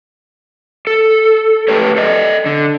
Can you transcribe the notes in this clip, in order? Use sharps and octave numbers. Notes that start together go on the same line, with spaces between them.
A4
A3 G4 A4 B4 C#5
A4 D5 D#5
D3